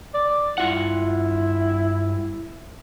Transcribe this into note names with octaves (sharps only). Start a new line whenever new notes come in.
D5
G2 E4 F4 F#5